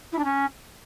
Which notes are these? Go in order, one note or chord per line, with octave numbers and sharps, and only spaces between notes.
E4
D4
C#4